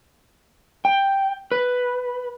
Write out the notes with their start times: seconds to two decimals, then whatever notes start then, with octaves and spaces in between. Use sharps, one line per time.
0.85 G5
1.52 B4